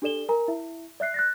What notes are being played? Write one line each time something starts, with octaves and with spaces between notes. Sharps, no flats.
D4 G4 A4 D5 E7 G7
A#4 G#5 A#5
E4 E5
D5 E5 F#6 C7
F#6 A6 A#6